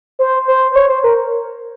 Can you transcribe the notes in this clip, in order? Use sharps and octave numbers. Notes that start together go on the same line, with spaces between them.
C5
C5
C5
C#5
C5
A#4